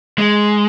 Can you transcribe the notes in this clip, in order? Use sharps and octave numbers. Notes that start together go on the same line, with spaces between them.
G#3